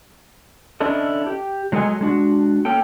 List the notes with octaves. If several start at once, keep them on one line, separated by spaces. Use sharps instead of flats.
C#4 D4 E4 A4 D#5
G4
F#3 G#3 A3 A4 D#5 G#5
G#3 D4 F#4
A#3 C#4 A4 G5